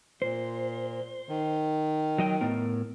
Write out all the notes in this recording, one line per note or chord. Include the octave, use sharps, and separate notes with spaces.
A#2 C5
D#3
F#3 D#5 G5
A2 B3 A#4